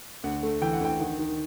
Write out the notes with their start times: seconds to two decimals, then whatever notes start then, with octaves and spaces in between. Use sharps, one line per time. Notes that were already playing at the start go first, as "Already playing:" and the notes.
0.24 D2 F#5
0.43 A3
0.62 E3 G5
0.73 F#5
0.81 D2 G5
1.00 D#3 F#5
1.19 D#3